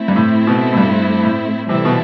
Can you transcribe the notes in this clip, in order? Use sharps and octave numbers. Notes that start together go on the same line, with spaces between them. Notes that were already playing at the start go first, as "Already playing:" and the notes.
Already playing: A3 C4 E4
G2
A2
B2
A2
G2
A2
C3 E3 G3 C4 E4 A4
B2